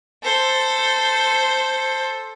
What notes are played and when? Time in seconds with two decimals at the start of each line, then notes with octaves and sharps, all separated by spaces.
0.23 A4 C5